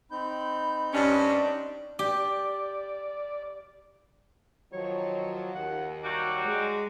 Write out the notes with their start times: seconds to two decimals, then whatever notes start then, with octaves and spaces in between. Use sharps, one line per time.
0.11 C4 D#4 B5 G6
0.94 G2 C#4 D4
1.99 G4 D5
4.73 D#3 F3 F#3 C#5
5.55 D#2 F#5
6.04 F#3 G3 F#4 D6
6.45 G#3